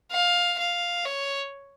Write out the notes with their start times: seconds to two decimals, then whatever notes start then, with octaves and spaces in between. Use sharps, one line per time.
0.12 F5
0.58 F5
1.05 C#5